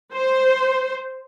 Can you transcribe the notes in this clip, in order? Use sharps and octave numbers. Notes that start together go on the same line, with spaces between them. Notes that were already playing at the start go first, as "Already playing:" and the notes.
C5